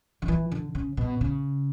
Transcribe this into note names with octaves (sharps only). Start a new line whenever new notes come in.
D3
E3
D3
C#3
B2
C#3